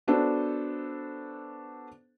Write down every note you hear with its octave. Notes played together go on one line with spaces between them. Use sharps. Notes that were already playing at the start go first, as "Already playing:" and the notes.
B3 D4 F#4 A4 C5